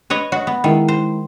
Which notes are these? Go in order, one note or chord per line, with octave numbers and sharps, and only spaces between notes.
B4 C#5 D#5
F#4 C#5 D#5
B3 B5
D#3 G#3 E4 A#4
C5